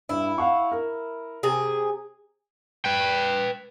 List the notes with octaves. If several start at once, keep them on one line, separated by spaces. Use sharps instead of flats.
G2 E4
F5 F#5 C#6
A#4
C3 G#4
B4 G5